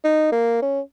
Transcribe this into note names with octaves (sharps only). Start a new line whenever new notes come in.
D#4
A#3
C#4